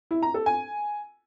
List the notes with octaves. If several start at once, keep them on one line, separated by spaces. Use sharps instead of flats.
E4
A#5
A4
G#5